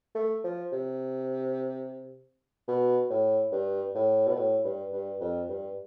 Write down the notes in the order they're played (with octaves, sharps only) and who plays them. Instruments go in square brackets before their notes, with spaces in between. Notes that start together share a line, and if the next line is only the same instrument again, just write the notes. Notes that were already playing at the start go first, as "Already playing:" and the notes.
[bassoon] A3
F3
C3
B2
A2
G2
A2
B2
A2
G2
G2
F2
G2